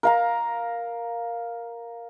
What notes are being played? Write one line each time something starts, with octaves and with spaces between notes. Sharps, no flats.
A#4 F5 A#5